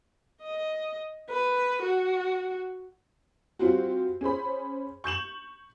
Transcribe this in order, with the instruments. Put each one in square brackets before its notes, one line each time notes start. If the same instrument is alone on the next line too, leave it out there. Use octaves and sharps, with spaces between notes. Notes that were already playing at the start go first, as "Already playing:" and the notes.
[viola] D#5
B4
F#4
[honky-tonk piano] G3 C4 F4 F#4
C#4 G#4 C5 B5
C#6 G6 E7 F#7